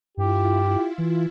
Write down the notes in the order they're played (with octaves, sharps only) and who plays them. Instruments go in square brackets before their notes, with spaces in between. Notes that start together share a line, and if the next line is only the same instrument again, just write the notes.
[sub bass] G2 [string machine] E4 F4 [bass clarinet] G4
[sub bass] E3